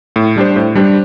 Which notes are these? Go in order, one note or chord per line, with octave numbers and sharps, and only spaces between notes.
A2
G3 D4 G4 C5
A2
G3 D4 G4 C5